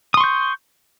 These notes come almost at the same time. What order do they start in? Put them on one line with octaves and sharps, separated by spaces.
D#6 C6 C#6 G6